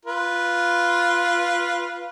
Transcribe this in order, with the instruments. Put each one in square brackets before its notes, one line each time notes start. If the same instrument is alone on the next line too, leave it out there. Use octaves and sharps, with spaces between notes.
[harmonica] F4 B4